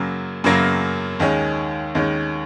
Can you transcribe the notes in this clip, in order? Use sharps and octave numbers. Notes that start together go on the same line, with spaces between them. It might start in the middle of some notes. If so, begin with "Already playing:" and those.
Already playing: F#2 C#3 F#3 A#3
F#2 C#3 F#3 A#3
D#2 D#3 G#3 C#4
D#2 D#3 G#3 C#4